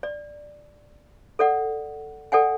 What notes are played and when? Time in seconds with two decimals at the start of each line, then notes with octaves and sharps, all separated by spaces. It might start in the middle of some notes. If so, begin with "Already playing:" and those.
0.03 D5
1.39 A4 D5 F#5
2.32 A4 D5 F#5 G#5